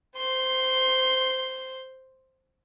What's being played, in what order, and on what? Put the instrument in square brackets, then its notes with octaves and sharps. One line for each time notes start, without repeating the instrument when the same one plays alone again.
[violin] C5 C6